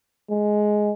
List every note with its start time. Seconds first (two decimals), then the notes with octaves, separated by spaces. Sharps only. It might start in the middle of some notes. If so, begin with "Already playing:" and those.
0.30 G#3